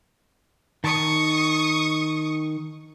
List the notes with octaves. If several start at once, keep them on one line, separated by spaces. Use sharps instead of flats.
D#3 A5 C#6 D#6